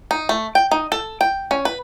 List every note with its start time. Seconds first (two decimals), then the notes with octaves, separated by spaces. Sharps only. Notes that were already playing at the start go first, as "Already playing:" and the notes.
0.11 D#4
0.29 A3
0.55 G5
0.71 D#4
0.92 A4
1.21 G5
1.51 C#4
1.65 B4